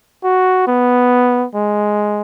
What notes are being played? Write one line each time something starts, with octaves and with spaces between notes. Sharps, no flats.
F#4
B3
G#3